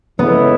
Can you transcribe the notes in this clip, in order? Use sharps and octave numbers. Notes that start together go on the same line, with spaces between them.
C#2 C#3 E3 A3 B3 E4